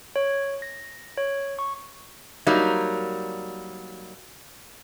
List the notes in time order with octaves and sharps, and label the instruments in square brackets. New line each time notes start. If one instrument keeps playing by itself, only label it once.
[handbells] C#5
A#6
C#5
C#6
[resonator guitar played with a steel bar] F#3 G3 A#3 D#4